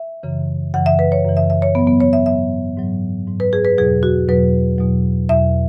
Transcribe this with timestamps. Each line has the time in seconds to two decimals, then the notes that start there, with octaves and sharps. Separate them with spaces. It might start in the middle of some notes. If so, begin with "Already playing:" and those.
Already playing: E5
0.23 F#2 C#3 E3
0.74 F#2 C#3 E3 F#5
0.86 E5
0.99 B4
1.12 C#5
1.25 F#2 C#3 E3
1.37 E5
1.50 E5
1.62 C#5
1.75 G#2 F#3 B3
1.87 B3
2.00 C#5
2.13 E5
2.25 G#2 F#3 E5
2.77 G#2 F#3
3.28 G#2 F#3
3.40 B4
3.53 G#4
3.65 B4
3.78 E2 B2 F#3 G#4
4.03 F#4
4.29 E2 B2 F#3 B4
4.78 E2 B2 F#3
5.29 E2 B2 F#3 E5